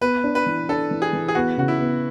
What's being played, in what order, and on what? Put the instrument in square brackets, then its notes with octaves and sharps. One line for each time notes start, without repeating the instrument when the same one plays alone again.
[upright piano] B3 [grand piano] B4
[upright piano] D4
[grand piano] B4
[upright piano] E3
[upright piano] D4 [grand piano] A4
[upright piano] E3
[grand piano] G#4
[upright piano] E3
[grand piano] G#4
[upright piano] B3 [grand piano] F#4
[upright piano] C#3 [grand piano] F#4
[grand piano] E4
[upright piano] B3